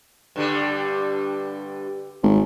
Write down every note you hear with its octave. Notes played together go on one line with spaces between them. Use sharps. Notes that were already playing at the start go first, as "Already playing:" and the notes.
G2 D3 G3
G#1